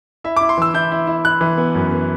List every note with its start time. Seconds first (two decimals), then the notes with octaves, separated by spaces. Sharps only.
0.24 E4 E5
0.36 E4 D6
0.49 C6
0.58 E3 E6
0.74 E4 G6
0.92 E4
1.07 E4
1.25 E4 F#6
1.41 E3
1.57 B3
1.75 F#2
1.92 B3